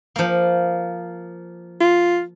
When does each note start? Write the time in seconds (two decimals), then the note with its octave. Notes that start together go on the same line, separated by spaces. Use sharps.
0.16 F3 A#3
1.81 F4